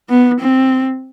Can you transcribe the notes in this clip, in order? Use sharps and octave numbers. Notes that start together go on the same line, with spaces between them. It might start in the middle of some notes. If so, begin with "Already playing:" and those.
B3
C4